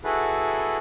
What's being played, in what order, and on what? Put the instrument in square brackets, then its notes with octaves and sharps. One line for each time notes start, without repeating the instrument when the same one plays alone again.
[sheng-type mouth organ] E4 F#4 G#4 A4 B4